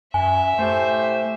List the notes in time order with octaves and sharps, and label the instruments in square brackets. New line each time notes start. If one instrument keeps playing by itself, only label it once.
[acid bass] F#2 [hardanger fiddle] E5 [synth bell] G#5
[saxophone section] A2 G4 C5 [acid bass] A3